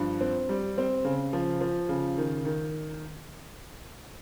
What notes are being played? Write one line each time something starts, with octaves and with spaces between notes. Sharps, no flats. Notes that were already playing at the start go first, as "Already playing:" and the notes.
Already playing: G2 F3
C4
G3
C4
C#3
F3
F3
C#3
D#3
D#3